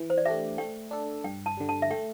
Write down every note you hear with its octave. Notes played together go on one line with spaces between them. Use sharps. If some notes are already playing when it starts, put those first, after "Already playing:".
Already playing: E3
C5
D5
A3 D4 G4 E5
A3 G5
D4 A4
G2 G5
A5
D3 G3
A5
E5
A3 G5